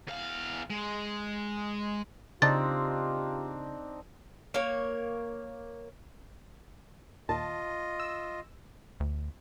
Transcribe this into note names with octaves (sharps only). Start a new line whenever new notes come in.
E2 F5
G#3
C#3 C4 D4 D#4 F4 G4 A6
A#3 C#5
D#2 A#2 F4 D#5 A5
E6
D2